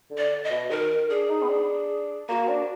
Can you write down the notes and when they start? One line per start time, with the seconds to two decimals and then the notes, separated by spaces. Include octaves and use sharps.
0.11 D3
0.18 D5
0.44 D#5
0.50 B2
0.70 D#3 A#4
1.10 D4 G#4
1.29 D#4
1.42 B3
1.49 D4
2.29 A#3 F#4
2.48 D4